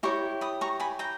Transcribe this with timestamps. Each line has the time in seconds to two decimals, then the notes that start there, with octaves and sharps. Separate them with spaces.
0.03 E4 G4 C#5 A#5 C#6
0.41 B5 D#6
0.61 A#5 C#6
0.80 G#5 B5
0.99 G5 A#5